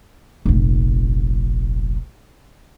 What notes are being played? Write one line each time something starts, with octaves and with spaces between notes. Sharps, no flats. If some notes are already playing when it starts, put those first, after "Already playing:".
F1 A#1